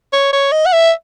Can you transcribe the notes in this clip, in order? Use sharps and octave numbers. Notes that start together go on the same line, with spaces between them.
C#5
C#5
D#5
F#5
E5